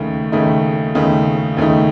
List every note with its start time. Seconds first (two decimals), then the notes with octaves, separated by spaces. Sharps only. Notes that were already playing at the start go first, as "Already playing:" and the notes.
Already playing: D#2 C#3 A3 D#4
0.32 D#2 C#3 A3 D#4
0.95 D#2 C#3 A3 D#4
1.57 D#2 C#3 A3 D#4